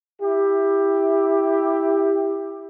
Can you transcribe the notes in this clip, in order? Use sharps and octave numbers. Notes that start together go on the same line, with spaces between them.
E4 G4